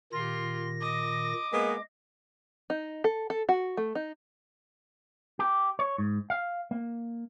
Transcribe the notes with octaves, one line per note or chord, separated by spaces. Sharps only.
A#2 D#3 F4 G4 C6 A#6
D#5 D6
G#3 A#3 B3 D#5
D#4
A4
A4
F#4
A3
D#4
G4
C#5
G#2
F5
A#3